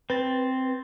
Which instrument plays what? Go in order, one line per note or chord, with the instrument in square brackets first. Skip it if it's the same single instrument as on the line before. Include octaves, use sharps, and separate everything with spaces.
[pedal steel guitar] C4 [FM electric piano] B4 A6